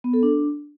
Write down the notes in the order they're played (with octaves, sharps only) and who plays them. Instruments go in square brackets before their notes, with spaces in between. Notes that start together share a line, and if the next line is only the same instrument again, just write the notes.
[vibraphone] B3
A4
D4